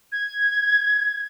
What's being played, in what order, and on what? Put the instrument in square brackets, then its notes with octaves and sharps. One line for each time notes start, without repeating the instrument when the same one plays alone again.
[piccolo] G#6